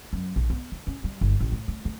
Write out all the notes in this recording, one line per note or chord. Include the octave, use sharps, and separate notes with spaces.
F#2
A#1
B3
E3
C#4
G3
G1
A1
A2
A3
A3